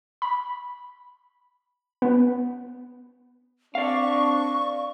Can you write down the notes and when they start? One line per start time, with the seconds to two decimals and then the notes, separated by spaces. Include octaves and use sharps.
0.22 B5
2.02 B3
3.75 C4 D4 D5 F5 C#6